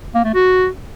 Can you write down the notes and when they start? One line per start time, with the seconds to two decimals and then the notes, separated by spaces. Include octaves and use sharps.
0.15 A#3
0.24 A3
0.34 F#4